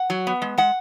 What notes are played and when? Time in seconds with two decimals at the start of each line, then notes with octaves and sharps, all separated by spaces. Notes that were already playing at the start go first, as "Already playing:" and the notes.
Already playing: F#5
0.10 F#3
0.27 B3
0.42 G#3
0.58 G#3 F#5